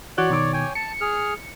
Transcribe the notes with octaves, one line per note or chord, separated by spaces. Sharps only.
E3 F#4 C#5 D5 F#6
B2 D#3 D6
C#5 G5 G#5
A5 C#7
G#4 F6